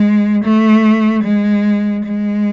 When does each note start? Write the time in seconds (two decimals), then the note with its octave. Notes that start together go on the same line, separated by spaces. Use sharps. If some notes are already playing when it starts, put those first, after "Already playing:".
Already playing: G#3
0.44 A3
1.24 G#3
2.05 G#3